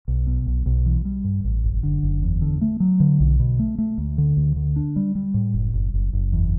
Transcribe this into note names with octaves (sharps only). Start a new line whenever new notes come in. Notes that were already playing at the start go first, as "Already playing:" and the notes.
B1
B2
B1
B1
E3
G3
G2
A1
F#1
D3
F#1
E2
D3
A3
F#3
D3
B1
B2
A3
A3
D2
D3
D2
D3
D4
G3
G3
A2
F#1
F#1
F#1
F#1
E2